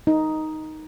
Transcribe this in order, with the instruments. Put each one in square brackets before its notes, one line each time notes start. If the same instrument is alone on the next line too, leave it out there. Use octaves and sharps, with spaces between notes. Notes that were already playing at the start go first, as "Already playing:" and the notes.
[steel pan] D#4